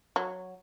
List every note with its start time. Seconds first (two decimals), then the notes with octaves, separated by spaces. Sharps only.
0.16 F#3